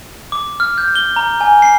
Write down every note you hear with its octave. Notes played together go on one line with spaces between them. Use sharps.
D6
F6
G6
G7
A#5
G#5
C7